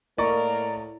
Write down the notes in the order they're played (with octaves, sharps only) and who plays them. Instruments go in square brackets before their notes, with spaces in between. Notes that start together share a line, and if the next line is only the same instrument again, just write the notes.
[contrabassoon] A2 [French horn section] A#3 A#4 [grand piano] D5 D#5 C#6 [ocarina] A#5